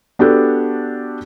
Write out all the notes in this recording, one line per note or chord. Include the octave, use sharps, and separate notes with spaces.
B3 D4 F#4 G4 A4